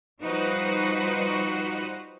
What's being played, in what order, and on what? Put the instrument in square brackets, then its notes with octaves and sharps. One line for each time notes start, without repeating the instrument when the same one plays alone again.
[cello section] F3 G3 D#4 F#4 B4 C5